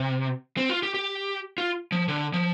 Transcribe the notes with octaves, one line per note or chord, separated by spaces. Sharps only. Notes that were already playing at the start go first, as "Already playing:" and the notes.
Already playing: C3
C4
F4
G4
G4
F4
F3
D3
F3